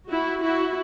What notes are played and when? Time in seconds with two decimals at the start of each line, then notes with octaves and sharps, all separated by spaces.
0.09 E4 F#4
0.42 E4 F#4